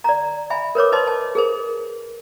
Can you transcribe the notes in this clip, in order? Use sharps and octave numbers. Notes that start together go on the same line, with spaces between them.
D5 A#5
E5 G#5 B5
A#4 B4 C#5 D6
B4 C5 D#5 A5 C6
A5
G#4 A#4 C5